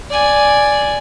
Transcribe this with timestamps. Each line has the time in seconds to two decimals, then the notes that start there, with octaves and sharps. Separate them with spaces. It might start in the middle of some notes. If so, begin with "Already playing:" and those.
0.10 D5 G#5